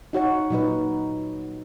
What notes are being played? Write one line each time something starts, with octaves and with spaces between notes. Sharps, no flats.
D#4 F#4 C#5 F#5
A#2 F#3 D#4 B4